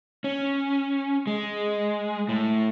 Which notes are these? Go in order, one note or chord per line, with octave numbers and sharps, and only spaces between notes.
C#4
G#3
A2